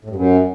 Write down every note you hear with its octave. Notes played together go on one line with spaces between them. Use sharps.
A2
G2
F#2